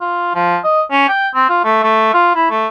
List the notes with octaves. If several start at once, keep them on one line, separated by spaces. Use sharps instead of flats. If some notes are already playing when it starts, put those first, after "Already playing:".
F4
F3
D#5
C#4
G5
C4
F4
A3
A3
F4
E4
A3